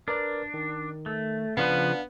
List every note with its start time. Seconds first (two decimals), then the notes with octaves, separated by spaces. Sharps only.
0.08 D4 A#4 B4 D5
0.54 D#3
1.06 A3
1.57 C#3 F3 B3 D4 B4 F5